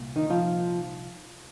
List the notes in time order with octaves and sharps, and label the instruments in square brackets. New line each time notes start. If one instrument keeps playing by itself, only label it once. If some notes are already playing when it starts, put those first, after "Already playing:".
Already playing: [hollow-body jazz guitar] C2 A#2
D#3 D#4
F3 F4